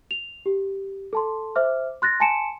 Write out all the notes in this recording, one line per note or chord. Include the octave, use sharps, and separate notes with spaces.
F7
G4
A4 A5 C6
C5 E5 D6 F6
C6 F#6 A6 A#6
G#5 A5 C6 C#7 D7 E7